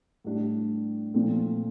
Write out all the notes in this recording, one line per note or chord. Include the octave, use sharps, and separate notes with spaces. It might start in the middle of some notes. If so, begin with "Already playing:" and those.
A2 G3 D4
A#2 F3 A3 C4